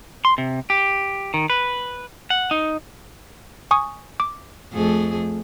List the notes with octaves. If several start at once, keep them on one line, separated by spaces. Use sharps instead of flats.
C6
C3
G4
D#3
B4
F#5
D#4
G#5 C#6 D#6
D6
F2 A3 G#4